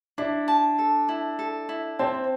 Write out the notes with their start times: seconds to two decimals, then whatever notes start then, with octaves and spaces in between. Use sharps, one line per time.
0.18 D4 E4
0.48 A5
0.79 A4
1.09 E4
1.39 A4
1.69 E4
1.99 C4 A5